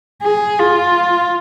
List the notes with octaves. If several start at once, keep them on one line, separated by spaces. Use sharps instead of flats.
G#4
F4